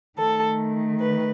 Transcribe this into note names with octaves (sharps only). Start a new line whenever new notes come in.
D#3 A3 A4
B4